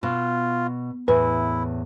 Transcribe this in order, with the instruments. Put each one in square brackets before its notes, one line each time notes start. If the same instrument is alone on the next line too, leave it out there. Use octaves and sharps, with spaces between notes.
[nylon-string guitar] B2 [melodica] F4
[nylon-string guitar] E2 A2 [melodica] E4 [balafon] B4